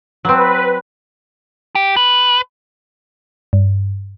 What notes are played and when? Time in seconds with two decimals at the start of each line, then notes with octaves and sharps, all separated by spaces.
0.25 F#3 C4 B4
1.75 G4
1.96 B4
3.53 G2